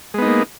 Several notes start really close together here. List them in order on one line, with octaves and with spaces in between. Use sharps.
G#3 B3 D#4 A#3